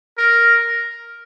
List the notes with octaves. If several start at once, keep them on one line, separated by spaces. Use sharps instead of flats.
A#4